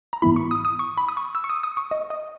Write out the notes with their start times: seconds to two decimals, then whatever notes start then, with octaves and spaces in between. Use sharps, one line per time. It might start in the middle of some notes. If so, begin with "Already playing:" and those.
0.13 A#5
0.22 G#2 E3 B3 E4 B5
0.36 C#6
0.51 D#6
0.65 D#6
0.79 C#6
0.97 B5
1.08 D#6
1.17 C#6
1.35 E6
1.44 C#6
1.49 D#6
1.63 D#6
1.77 C#6
1.91 D#5
2.10 D#5